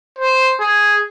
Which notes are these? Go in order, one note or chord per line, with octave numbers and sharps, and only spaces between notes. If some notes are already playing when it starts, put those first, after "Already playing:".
C5
G#4